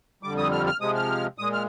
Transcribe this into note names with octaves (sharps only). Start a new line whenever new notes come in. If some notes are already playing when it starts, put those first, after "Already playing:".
F2 D3 G3 D6
D#6
F6
F6
C3 F3 G#3 D#6
F6
A#2 G#3 D#6
F6